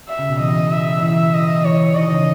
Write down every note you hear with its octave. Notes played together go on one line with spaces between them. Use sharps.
E5
C#3
B2
E3 D#5
E5
E3 E5
D#5
E3 C#5
D#3 D#5
C#3